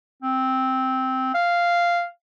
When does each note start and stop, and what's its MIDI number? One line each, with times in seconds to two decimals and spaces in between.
0.22 1.32 60
1.34 2.05 77